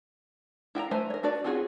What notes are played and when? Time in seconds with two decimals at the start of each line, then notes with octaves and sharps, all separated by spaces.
0.75 E4 G5 G#5 A#5
0.91 A3 B4 C5 E5 G#5
1.10 A#4 C#5
1.23 D4 F#4 B4 D5
1.44 C4 C#4 F4 F#4 G#4